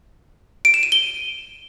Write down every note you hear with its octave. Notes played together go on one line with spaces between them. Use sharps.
D7
E7
D#7
G7